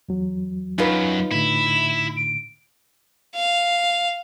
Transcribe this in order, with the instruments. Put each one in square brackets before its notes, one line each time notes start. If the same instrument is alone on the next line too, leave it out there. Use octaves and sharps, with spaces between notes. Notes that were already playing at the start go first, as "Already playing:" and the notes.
[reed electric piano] E2 F#3
[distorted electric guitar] F#2 [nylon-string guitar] D#4 F4 B4
[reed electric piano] A2 D3 [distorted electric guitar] E4 [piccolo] E7
[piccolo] D7
[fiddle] F5